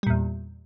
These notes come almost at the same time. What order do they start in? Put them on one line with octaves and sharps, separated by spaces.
G3 A#2 E2